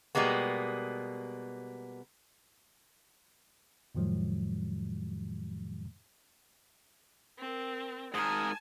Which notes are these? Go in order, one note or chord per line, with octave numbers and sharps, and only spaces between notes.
B2 G3 G#3 A#3 B3
F2 A2 D#3 F3 F#3 G#3
C4 A#4
G#2 A#4 G#5 A5 D#6